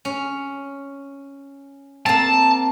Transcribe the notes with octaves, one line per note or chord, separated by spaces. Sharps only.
C#4
A#3 C4 A5